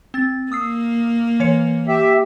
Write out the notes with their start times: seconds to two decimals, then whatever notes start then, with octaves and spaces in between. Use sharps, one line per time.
0.14 C4 A6
0.52 A#3 D#6 E6 C7
1.40 E3 C#5 C#7
1.88 G4 E5